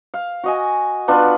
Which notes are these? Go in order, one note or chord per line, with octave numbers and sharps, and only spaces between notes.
F5
F#4 D#5 G#5
B3 D4 F4 B4